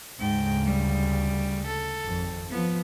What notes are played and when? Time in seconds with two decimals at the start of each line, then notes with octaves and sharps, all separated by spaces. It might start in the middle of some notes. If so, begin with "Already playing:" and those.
0.19 D2 G#2 C#3 G5
0.65 G3
1.67 A4
2.03 G#1 F2
2.51 F3 B3